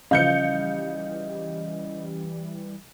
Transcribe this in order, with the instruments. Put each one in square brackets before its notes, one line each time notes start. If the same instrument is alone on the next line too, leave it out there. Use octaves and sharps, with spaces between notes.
[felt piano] C#3 F3 [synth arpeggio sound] E3 G3 [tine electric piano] D#5 [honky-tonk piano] F5 G6 C#7